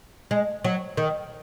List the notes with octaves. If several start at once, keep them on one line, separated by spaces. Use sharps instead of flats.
G#3
F#3
D#3